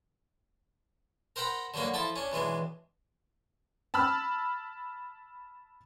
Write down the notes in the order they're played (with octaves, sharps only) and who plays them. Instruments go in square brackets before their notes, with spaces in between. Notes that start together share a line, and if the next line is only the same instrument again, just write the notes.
[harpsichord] A#4 C5 F#5 G5 A#5 B5
D3 F#3 G3 A#3 F#4
F3 E4 A4 A5
C#4 D4
B1 E3 G#3 D4
[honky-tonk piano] A5 B5 E6 F6